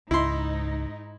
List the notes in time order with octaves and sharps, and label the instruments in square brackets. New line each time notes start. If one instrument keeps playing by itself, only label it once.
[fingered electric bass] C#2 [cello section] G#2 D#4 [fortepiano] E4 C6